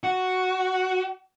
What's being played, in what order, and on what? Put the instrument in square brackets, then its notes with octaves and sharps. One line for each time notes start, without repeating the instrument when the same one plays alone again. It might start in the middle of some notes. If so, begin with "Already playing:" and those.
[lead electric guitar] F#4